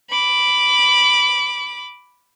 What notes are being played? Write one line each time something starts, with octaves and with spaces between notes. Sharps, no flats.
B5 D6